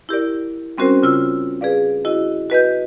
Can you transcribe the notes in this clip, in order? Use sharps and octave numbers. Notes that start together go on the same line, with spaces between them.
E4 G4 A#4 D5
G3 C4 C#4 F#4 A#4 C5
C#3 F4 E6
G#4 B4 D5 F5
E4 F#4 D#5
F#4 B4 D#5 G6